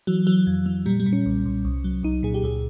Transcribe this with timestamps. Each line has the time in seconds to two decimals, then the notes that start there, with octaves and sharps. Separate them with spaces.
0.07 E3 F#3
0.27 E3 F#3
0.47 F2
0.66 E3
0.86 A#2 G3
1.00 G3
1.06 A#2
1.13 C#4
1.26 B1
1.46 B1
1.65 C2
1.84 F#3
2.03 C2 D#4
2.23 A#2 G#4
2.34 G4
2.44 C#2 G#4